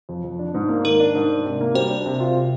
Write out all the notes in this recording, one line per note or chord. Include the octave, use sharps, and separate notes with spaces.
F2
F2
D4
G#2
A#3
D#3 A#4
D4
G#2
D4
C3
A#3
G3 C5
D4
C3
F4
C3